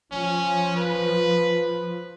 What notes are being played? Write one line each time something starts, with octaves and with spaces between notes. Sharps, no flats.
F3 C#4
B4